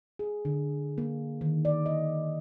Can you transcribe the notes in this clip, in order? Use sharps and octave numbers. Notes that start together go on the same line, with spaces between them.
G#4
D3
A#3
D#3
D5
D#5